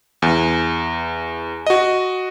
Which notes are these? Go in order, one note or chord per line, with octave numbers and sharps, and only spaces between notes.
E2
F#4 D#5